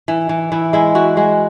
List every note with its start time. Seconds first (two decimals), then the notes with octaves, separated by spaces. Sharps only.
0.08 E3
0.29 E3
0.52 E3 E4
0.73 G#3 E4
0.95 E3 F#4
1.17 G#3 F#4